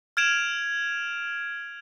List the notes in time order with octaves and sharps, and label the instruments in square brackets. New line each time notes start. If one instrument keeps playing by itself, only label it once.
[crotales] F6 G#6 D7 E7 F7